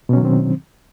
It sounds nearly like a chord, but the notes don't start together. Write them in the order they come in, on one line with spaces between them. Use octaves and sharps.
B2 C#4 F#3 D#3 C4